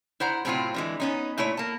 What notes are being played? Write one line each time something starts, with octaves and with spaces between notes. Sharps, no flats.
E4 C5 F#5 A#5
A2 C3 F#3 C4 E4 F4
D3 E3 G#3
B3 C#4 D#4
A#2 A3 E4 C#5
A#3 A5